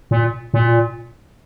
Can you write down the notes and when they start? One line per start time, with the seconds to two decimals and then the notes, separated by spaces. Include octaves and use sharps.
0.11 A#2
0.54 A#2